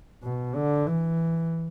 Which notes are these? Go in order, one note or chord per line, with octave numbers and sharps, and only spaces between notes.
B2
D3
E3